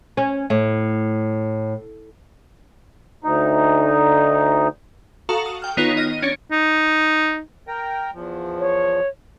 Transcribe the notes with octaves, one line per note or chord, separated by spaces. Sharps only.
C#4
A2
D2 D#4
F#4 A4 F5 A#5 C#6 D#6
D#6
G5 F6
D#3 B3 D#4 F4 C#5
D#5 F6 A#6 D#7
C#4 D4 C#5
D#4
A#4 G5 A#5
E2 F3
C#5